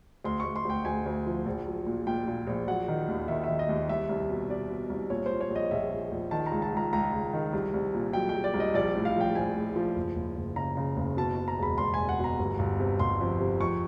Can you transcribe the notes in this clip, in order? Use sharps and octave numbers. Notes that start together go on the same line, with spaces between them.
D2 C6
D2 C#6
C6
D2 G5
D2 G#5
D2
F3
A#1
F#3
A#2
A#2 G5
A#2
A#1
F#3 F#5
D#3
D#2
D#3 E5
E5
D#3
D#5
D#2
C2 E5
C2
B2
B2 D5
B2
C2
A#2 C#5
C5
A#2
C#5
A#1
D#5
A#1 E5
A#1
A#1
D#3 A5
A#5
C#2
A5
C#2 A#5
C#2 A#5
C#2
D#3
C2
C2
A#2
F#3 G5
G5
F#3
D5
C2
D#5
A#1 D5
A2
F5
F3 G5
A#1 G#5
A2
F3
F#1
F#1
F#1
C#3 A#5
C#3
F#1
B2 A5
B2
A#5
E1 B5
E1 C6
E1 G#5
F#5
B2 A#5
G1
G1
C3
G1 C6
F2
C3
F2 C#6